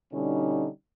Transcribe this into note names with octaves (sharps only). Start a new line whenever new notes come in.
B2 D3 G3 C#4 D#4